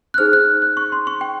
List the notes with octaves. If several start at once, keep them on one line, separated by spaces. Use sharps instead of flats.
F#6
D#4 G#4 C5 F6
F#6
F#6
C#6
C6
C#6
G5